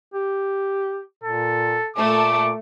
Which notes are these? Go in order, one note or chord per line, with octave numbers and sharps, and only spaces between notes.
G4
A#2 A4
A#2 A3 D6